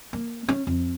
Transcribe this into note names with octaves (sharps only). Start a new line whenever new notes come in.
A#3
C#4
F2